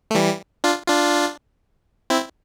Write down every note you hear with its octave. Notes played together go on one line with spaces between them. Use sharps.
A3
E3 G3
D4 F4
D4 F4
C4 E4